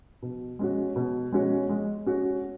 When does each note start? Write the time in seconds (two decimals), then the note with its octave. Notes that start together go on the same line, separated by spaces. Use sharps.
0.22 B2
0.59 G#3 C#4 F#4
0.96 B2
1.32 G#3 C#4 F#4
1.69 G#3
2.06 C#4 F#4